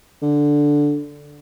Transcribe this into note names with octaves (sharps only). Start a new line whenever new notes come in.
D3